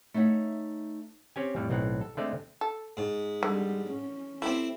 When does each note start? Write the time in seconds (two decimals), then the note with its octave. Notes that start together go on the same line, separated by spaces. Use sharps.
0.14 A3 D#4 C#5 E5 F#5
1.36 C4 C#4 G4 G#5
1.56 F2 A2 G3
1.70 B1 A2 C4 F#5
2.01 A4
2.17 D3 G#3 A3 C4 D5
2.61 A4
2.97 G#2
3.43 D3 G3
3.91 C#4
4.42 A3 C4 E4 G4